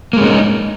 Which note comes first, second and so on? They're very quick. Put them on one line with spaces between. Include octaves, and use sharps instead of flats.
A#3 G#3 C#4 D#4